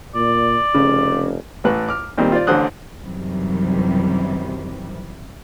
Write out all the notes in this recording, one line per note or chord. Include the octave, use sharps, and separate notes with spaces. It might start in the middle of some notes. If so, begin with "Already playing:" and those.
A#2 D5
F1 C#3
A1 A2 B4 F#6
D6 F6
A#2 D#3 G3 C4
F4 C5 D5
A1 D3 C5 D#6 F#6
F#2 C3 D#3 E3 F#3 G3